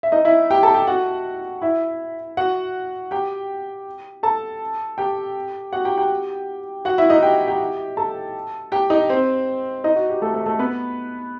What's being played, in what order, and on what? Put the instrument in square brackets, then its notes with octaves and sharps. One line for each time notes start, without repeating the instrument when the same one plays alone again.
[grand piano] E5
D#4 D#5
E4 E5
G4 G5
A4 A5
G4 G5
F#4 F#5
E4 E5
F#4 F#5
G4 G5
A4 A5
G4 G5
F#4 F#5
G4 G5
G4 G5
F#4 F#5
E4 E5
D#4 D#5
G4 G5
G4 G5
A4 A5
G4 G5
D#4 D#5
C4 C5
D#4 D#5
F#4
G4
A3 A4
A3 A4
A3 A4
B3 B4